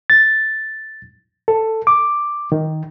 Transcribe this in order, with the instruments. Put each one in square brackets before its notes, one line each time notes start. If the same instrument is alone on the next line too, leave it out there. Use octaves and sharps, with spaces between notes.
[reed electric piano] A6
A4
D6
D#3